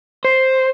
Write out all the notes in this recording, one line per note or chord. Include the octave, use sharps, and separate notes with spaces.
C5